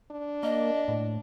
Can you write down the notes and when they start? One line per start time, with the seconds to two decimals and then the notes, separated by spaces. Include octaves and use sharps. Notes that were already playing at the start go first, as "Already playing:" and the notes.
0.12 D4
0.43 A#3 D#5
0.88 A2